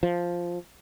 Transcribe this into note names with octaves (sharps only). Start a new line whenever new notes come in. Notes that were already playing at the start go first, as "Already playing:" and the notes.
F3